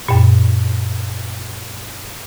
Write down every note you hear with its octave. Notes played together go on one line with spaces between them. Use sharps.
F#2 A#2